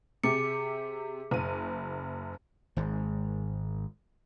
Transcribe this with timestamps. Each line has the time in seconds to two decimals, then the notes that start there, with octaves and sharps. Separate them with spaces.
0.24 C3 G4 G#4 D6 C#7
1.31 F#1 D#7
2.76 G#1 G#2